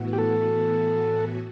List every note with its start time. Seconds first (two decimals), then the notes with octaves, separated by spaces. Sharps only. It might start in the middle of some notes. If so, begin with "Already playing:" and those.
Already playing: A2 E3 B3 F#4
0.13 G4
0.18 A4